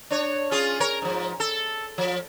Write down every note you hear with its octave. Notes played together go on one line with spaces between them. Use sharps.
D4 C#5
C#4 F4 G#4
A#4 C#5
G#2 F3
A4
F3